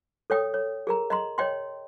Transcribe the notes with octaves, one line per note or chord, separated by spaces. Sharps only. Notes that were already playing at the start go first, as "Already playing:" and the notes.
A4 C#5 G5 D#6
C#5
G#4 A#4 A#5
D#5 A#5 C6
C#5 D#5 G5 C6